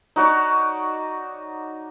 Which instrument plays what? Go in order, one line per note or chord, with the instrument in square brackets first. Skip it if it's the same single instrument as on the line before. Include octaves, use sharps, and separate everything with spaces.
[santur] D#4 F#4 C#5 D5